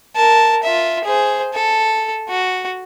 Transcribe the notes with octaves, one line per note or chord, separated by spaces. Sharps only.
A#4 A5
F4 E5
G#4 C5
A4
F#4